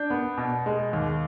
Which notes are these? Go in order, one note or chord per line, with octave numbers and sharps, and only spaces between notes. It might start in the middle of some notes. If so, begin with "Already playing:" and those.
Already playing: D4 G6
B3
B2
G#3
D#2